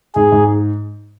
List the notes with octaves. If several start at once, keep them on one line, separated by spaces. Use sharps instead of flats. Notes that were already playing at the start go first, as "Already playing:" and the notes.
G#2 G#4
G#2